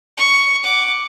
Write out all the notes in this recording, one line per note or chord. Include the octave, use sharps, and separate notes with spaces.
C#6
F#5 D6